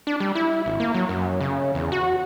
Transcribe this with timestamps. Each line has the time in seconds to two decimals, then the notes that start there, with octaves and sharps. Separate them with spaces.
0.07 D4
0.20 G3
0.35 E4
0.66 G#1
0.80 A#3
0.94 F#3
1.09 F#2
1.40 C#3
1.75 E2
1.92 F#4